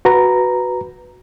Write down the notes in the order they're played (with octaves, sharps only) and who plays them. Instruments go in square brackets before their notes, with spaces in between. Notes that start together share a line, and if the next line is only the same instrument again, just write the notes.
[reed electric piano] F#4 B4 A#5